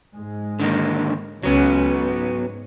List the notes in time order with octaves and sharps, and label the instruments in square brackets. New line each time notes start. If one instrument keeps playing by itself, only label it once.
[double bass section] G#2 G#3
[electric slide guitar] D3 D#3 A#3
[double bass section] C#2 C#4 [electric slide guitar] F#3 B3
[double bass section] G#2